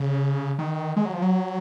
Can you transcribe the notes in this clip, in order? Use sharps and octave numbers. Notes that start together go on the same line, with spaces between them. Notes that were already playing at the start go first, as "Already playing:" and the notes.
Already playing: C#3
D#3
G#3
F#3
F3
F#3